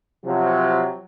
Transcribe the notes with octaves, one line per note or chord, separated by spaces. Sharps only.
C3 F3 F#3